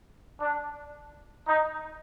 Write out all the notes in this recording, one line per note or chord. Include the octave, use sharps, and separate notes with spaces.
D4
D#4